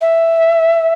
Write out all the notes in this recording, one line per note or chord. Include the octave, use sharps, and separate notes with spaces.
E5